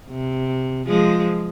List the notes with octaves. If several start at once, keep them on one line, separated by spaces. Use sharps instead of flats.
C3
F3 G#3